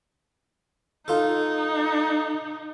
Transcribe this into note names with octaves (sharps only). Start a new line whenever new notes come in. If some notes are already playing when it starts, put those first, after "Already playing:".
D#4 F4 A4